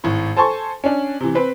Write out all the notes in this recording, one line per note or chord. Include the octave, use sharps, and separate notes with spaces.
G#1 A2
A4 C5 G#5 A5 C6 C#6
C#4 D4
C3 E3
C4 B4